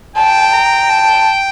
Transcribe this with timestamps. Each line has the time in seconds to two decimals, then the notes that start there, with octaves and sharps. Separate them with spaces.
0.16 G5 A5
0.53 A#5
0.89 A5